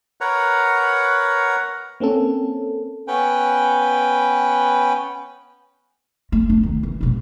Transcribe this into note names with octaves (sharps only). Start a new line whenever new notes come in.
A#4 B4 C#5 F#5 A#5
A#3 C4 C#4 A4
B3 C#4 B4 G5
A3
D4
D#3
E3
E1 A#1